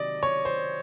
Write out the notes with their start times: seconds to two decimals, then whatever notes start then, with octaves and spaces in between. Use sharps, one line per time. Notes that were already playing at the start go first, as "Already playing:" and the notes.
Already playing: C3 D#3 F#3 D5 D#5
0.23 C#5
0.45 C5